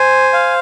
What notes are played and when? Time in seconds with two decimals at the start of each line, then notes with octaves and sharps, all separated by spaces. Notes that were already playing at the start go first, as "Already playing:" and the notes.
Already playing: C5 G#5
0.33 F5